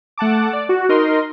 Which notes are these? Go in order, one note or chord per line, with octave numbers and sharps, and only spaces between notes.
A3 F#5 A5 D6
D5
F#4
D#4 A#4 D#5 C6